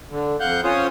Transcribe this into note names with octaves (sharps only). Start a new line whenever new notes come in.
D3
F2 F5 F#5 F#6 G6
C#4 F4 C5 C#5 D#6